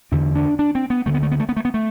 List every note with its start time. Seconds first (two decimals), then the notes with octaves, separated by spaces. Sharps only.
0.12 E2 D3 D4
0.35 D4
0.59 D4
0.75 C4
0.90 B3
1.06 D2 D3 A3
1.14 B3
1.23 A3
1.31 B3
1.40 A3
1.49 B3
1.57 A3
1.65 B3
1.74 A3